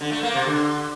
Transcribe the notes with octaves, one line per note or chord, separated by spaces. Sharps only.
D3
A3
A#3
C3
D3